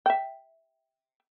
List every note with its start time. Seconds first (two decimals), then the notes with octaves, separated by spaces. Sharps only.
0.06 E5 G5